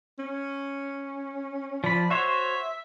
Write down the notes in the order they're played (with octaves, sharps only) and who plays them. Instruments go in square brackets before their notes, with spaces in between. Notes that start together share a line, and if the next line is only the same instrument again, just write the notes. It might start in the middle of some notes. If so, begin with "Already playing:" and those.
[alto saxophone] C#4
[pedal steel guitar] F3 B5 [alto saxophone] D5
[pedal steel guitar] F#4 C5 C#5 [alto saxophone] E5